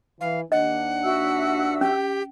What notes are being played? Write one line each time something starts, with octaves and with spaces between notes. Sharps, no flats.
E3 F5
D#2 D4 D#5 F#5
F#4 E5 E6
C#4 G4